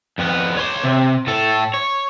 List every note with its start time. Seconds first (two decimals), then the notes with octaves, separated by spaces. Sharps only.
0.18 F2 B3
0.57 C#5 C6
0.84 C3
1.27 A2 A4
1.74 C#5